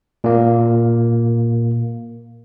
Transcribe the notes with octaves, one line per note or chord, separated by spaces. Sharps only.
A#2 A#3